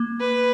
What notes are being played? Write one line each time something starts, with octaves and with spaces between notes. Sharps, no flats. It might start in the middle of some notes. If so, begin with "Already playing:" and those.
Already playing: A#3
B4